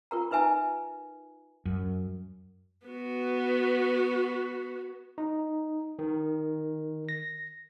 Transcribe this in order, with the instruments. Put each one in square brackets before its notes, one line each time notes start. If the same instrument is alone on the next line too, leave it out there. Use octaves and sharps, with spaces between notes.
[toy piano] F4 A#4 A#5
D#4 B4 E5 G#5 A#5
[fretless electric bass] F#2
[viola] B3 F#4
[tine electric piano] D#4
D#3
A#6